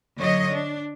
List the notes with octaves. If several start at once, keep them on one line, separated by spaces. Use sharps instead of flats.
D3 F#3 C#5 D#5
D4